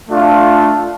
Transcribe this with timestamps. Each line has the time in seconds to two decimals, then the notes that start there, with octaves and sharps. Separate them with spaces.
0.09 A3 D4 F4